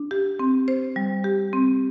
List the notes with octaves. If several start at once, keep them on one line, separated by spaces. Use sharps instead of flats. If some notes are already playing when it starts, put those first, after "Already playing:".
Already playing: D4
G4
C4
C5
G3
G4
C4